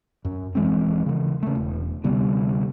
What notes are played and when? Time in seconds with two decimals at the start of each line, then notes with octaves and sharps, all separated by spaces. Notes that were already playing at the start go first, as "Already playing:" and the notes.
0.25 F#2
0.55 D#1 E3 G#3 C4
1.06 C#3 E3
1.43 C#3 A3
1.55 E1
2.04 D2 C3 G3 B3